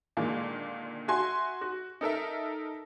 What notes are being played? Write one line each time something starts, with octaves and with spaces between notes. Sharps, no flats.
A#2 D3 D#3 G#3 A#3
F#4 E5 G#5 C6
F#4
D#4 A4 A#4 E5